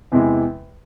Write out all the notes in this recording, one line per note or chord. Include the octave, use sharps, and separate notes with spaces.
E2 C3 E3 G#3